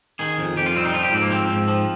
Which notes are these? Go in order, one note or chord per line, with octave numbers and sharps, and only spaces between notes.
D#3 G#4
F2
F2 G4
F4
G3 C4
D#4
F3 F4
G4
G#2 C4
A#3
F3 C4
G#2
F3